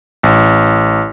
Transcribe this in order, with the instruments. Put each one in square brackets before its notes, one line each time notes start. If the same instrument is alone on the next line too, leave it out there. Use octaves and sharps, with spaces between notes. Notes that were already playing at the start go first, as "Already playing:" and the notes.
[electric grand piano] A1